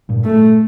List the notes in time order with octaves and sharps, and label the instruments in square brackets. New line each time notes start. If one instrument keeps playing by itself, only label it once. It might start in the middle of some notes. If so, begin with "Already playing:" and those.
[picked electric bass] G2 A#2
[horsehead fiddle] A3